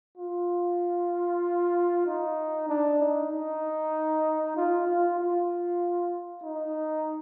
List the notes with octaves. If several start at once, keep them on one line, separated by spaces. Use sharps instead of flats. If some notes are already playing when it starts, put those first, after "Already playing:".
F4
D#4
D4
D#4
D#4
F4
F4
F4
D#4